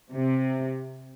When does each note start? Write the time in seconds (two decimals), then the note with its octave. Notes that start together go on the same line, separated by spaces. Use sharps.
0.12 C3